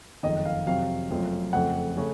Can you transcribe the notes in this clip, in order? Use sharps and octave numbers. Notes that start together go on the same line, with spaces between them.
F#1 F2 D#3 D#5
F5
F2 C3 F#3 C4 F5
F#1 F#2 F3 A3 C4
F2 C#3 A3 C4 F#5
C#3 A3 C#4